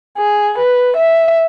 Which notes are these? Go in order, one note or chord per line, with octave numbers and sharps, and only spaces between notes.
G#4
B4
E5